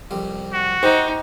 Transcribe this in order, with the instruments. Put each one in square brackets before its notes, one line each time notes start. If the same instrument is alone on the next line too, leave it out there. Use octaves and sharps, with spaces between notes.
[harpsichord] C2 F2 G3
[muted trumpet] F#4
[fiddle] D#4 [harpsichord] G4 [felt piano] C5